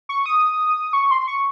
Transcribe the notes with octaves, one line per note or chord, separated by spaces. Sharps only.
C#6
D#6
C#6
C6
C#6